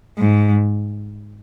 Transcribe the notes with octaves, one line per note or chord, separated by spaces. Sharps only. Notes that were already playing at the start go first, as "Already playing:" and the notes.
G#2